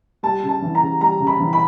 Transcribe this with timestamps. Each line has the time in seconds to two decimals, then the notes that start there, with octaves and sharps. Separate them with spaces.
0.23 G3 A5
0.43 C#3
0.49 A5
0.62 E3
0.75 A#5
0.81 C#3
1.01 G3 A#5
1.20 C#3
1.27 B5
1.40 E3
1.53 B5